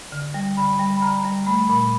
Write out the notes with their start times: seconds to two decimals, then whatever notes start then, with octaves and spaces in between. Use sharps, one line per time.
0.12 D3
0.34 G3
0.57 D3 B5
0.79 G3
0.97 B5
1.02 D3 A#5
1.25 G3
1.47 A3 B5
1.69 A#2 B5